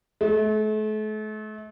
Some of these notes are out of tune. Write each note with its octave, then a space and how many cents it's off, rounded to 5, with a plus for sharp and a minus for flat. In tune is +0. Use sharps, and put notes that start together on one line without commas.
A3 -40